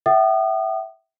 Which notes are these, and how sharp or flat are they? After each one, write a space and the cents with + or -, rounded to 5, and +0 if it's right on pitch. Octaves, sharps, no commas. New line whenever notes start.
E5 +0 G5 -45 D#6 -30